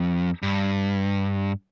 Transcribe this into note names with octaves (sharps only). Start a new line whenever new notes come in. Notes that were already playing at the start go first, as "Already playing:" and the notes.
Already playing: F2
G2